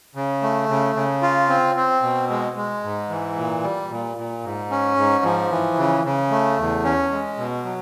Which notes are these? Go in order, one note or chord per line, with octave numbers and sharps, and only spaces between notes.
C#3
A3
C#3
C#3
F4
C4
C4
B2
G#3
G#3
G#2
E3
A#2
G3
A#2
A#2
G#2
C#4
G#2
F3
E3
C#3
C#3
A3
E2
C#4
G#3
B2
F#3